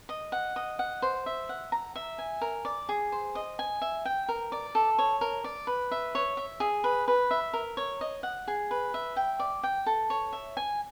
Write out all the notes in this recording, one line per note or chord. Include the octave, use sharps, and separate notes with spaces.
D#5
F#5
D#5
F#5
C5
E5
F#5
A#5
E5
G#5
A#4
D5
G#4
C5
D#5
G#5
E5
G5
A#4
D5
A4
C#5
A#4
D5
B4
E5
C#5
E5
G#4
B4
B4
E5
A#4
C#5
D#5
F#5
G#4
B4
E5
G5
D5
G5
A4
C#5
E5
G#5